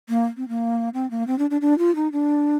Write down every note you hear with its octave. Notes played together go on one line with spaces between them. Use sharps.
A#3
C4
A#3
C4
A#3
C4
D4
D4
D4
F4
D#4
D4